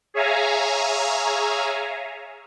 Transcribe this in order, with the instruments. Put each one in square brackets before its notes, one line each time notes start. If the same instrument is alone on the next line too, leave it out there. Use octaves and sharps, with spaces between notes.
[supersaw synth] G#4 C#5 E5 F5 G#5 A#5